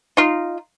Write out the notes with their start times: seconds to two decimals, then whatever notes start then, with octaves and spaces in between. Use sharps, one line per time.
0.17 D#4 F4